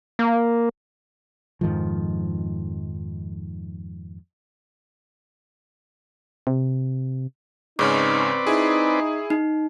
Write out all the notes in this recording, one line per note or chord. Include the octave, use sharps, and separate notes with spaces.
A#3
F2 G#2 D#3 F3
C3
G#2 C#3 C4 C#4 D#4 B4 D5 C#6
D#4 E4 G#4
D#4